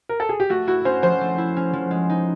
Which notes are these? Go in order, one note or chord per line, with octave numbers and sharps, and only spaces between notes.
A#4
A4
G#4
G4
A3 F#4
E4 F#4
C#4 C5
F3 C5
A3
E4
C#4
F3
G#3
D#4